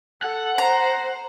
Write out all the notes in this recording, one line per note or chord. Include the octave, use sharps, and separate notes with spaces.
A4 F#5
C5 A#5